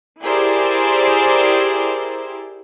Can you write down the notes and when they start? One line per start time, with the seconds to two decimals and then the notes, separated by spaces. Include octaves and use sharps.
0.23 E4 G4 G#4 A#4 C5 D5